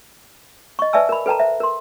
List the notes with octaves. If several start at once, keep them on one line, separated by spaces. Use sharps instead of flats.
D#5 C#6
B4 D5 E5 G#5 A5 E6
A#4 B5
A4 B4 G5 A5 A#5
C5 E5
A#4 C6